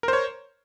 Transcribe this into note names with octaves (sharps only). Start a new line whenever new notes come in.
A#4 C5 C#5